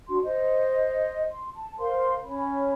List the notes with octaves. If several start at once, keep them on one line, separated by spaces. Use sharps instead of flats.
D4 F#4 C6
C5 D#5
C6
A5
A#4 C5 F5 C6
C#4 C#5 B5